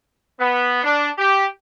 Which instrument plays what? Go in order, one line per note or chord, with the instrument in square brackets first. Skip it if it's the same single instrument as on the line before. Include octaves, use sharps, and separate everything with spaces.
[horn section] B3
D4
G4